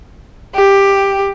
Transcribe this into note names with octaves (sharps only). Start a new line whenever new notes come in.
G4